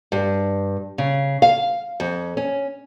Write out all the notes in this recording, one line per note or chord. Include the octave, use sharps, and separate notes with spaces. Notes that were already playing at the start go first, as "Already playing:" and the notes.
G2
C#3
F5
F2
C#4